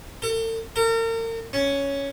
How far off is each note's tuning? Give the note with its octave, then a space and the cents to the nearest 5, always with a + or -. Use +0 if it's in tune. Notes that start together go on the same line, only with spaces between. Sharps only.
A4 +45
A#4 -40
C#4 +5